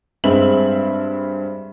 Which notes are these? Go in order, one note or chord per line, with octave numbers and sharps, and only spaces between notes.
G2 G#3 C4 E5 F#7